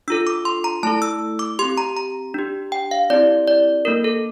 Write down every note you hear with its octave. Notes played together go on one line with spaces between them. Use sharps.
D4 F4 A4 E6
D6
C6
A#5
A3 E4 A4 A5
E6
D6
C4 G4 C6
A#5
A#5
D4 G4
G5
F5
C4 E4 G4 D5
D5
A#3 D4 A4 A#4
A4